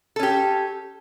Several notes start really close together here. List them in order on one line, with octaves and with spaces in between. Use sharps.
A4 C#4 G4